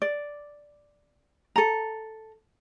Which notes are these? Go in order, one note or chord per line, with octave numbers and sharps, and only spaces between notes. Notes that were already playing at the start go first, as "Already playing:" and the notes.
D5
A4 A#5